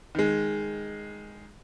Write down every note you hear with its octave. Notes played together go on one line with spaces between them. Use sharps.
D#3 G#3